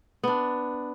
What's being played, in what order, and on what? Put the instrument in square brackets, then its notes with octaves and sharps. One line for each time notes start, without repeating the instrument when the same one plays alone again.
[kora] B3 D4